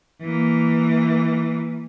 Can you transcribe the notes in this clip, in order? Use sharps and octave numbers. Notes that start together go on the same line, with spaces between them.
E3 A#3